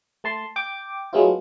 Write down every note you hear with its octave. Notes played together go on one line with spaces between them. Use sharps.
A3 A5 C6
G5 D6
F#3 G#3 A3 B3 E4 F4